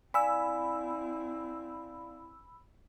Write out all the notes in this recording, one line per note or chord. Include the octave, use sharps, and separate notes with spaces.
C4 E4 D5 F5 G#5 B5 E6